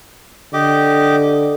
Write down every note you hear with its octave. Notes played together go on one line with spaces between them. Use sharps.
D3 G4 D#5 D6